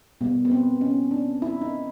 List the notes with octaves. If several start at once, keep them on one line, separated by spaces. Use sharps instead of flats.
B2 G3 A#3 B3
B3
C4
C#4
D4
E4
D#4